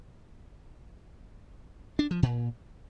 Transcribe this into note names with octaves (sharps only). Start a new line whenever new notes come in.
D4
F3
A#2